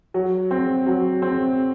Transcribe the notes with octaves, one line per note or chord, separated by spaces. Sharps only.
F#3
C4
F#3
C4